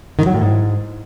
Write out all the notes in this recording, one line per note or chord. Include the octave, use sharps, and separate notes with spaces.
D#3
F#3
A2
G#2